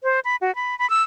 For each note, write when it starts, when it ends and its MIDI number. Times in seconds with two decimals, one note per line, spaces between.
0.04 0.20 72
0.25 0.36 83
0.41 0.54 66
0.55 0.77 83
0.79 0.89 83
0.90 1.02 88